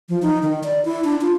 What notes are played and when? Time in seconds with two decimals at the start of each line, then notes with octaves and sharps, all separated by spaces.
0.09 F3
0.22 D#4
0.42 D#3
0.63 D5
0.85 E4
1.04 D4
1.21 F4